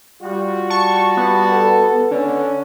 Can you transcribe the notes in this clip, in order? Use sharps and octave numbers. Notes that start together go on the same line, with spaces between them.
G3 F4 F#4
A5 C#6
B3
A4
D3 C#4